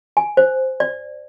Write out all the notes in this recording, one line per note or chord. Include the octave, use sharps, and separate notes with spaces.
G#5
C5
D5